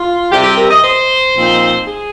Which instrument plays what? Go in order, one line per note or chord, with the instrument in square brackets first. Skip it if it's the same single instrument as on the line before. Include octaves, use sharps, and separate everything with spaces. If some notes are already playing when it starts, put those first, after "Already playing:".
Already playing: [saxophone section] F4
C3 G3 C4 G4
G4
A#4
D#5
C5
A#2 F3 C4 D#4
G#4